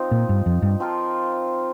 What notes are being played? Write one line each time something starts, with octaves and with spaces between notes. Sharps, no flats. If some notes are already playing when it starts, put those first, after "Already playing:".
Already playing: F3 C4 D#4
A#2
G2
F2
G2
F3 C4 F4 A#4